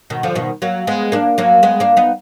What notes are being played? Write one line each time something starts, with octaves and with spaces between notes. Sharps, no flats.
B2 D#3
D3 F3
B2 D#3
F#3 A#3
G#3 B3
A#3 D4
F#3 A#3
G#3 B3
A#3 D4
B3 D#4